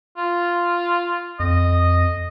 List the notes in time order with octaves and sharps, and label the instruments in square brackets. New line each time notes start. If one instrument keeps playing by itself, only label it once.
[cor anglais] F4
[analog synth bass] F2 [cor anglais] D#5